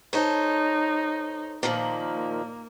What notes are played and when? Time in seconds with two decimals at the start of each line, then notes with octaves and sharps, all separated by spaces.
0.13 D#4 A4 C5 C#5
1.63 A#2 D#3 F3 A#3